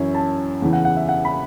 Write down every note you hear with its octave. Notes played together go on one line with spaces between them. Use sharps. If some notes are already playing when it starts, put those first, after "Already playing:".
Already playing: F#2 E3 C#4 E4
A5
E2 C#3 E3
F#5
F#5
E5
F#5
B5